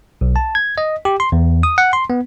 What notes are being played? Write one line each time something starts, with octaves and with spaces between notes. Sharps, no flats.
B1
A5
G#6
D#5
G4
C6
E2
D#6
F#5
C6
B3